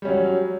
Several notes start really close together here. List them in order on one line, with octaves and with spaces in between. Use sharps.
G3 C#4 F#3